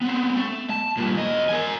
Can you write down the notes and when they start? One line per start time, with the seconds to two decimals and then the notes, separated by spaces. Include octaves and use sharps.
0.01 B3 C4
0.36 A3
0.70 A5
0.97 G2 A#2
1.16 E2 D#5
1.49 A#4 G#5